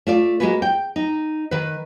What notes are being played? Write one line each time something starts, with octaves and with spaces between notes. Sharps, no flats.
A3 F4 D5
G#3 A#3 F#4 G#4 B4
G5
D#4
D#3 B4